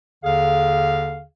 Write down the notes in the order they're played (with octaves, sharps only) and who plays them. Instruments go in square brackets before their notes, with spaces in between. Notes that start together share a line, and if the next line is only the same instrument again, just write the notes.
[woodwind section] D#2 D3 G#4 F5